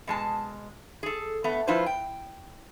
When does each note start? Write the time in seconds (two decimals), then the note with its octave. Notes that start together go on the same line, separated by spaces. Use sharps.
0.07 B2 G#3 A5
1.03 G#4 A4
1.44 A3 B3
1.67 F3 E4 F4 B4 C5
1.86 G5